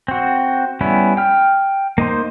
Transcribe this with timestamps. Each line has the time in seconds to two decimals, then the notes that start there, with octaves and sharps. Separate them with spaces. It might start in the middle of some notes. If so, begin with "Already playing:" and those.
0.08 C4 F#4
0.81 G3 B3 C#4 E4
1.17 G5 F6
1.98 A#3 D#4 C5